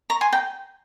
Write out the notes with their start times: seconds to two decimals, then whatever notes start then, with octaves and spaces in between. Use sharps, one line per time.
0.10 A#5 C#6
0.21 G#5 C6
0.33 G5 A#5